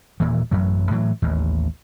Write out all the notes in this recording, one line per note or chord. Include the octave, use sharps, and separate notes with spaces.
D#1 A#2 E3
A1 F#2 F#3
A2 E3 F#3
A1 D#2